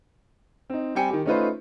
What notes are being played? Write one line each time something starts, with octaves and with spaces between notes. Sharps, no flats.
C4 D#4
G3 C4 G5 G#5 C#7
D#3 G4
A3 C#4 D#4 F4 B4 C5